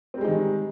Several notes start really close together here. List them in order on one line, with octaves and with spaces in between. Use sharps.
C4 G3 G#3 D#4 D#3